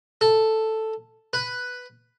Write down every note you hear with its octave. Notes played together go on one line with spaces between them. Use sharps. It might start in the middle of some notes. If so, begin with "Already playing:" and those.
A4
B4